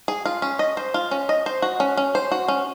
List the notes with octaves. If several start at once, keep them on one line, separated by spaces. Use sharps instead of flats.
G#4
F4
C#4
D#5
C5
F4
C#4
D#5
C5
F#4
C#4
C#4
C5
F#4
C#4